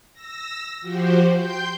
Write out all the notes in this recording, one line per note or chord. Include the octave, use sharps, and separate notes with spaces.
E6 A#6
F3 F#4 G4 C5
G5 C6 G6